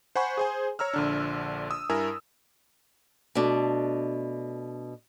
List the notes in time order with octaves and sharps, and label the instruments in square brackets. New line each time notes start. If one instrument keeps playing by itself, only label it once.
[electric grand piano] C5 F#5 G#5 B5 C#6
G#4 C5 G#5
C#5 A#5 E6 F6
A#1 D3 D4
D#6 E6
G2 E4 A#4 G#5 E6
[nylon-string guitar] B2 A3 D4